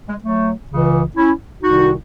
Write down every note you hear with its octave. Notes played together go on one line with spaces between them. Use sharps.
G#3
F#3 A3
C#2 C#3 E3
C#4 E4
C2 C3 D#3 D#4 F#4